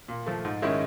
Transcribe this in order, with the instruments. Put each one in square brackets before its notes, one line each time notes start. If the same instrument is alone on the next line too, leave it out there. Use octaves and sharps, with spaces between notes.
[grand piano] A#2
F3 A3
G#2
D#3 G#3 C#4 E4